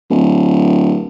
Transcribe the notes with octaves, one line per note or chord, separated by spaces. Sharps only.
D1